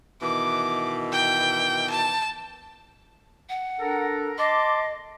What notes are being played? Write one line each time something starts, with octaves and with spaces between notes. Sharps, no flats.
B2 D#3 E3 D6
G5
A5
F#5
D4 A4 A#4
D#5 A5 C6 D6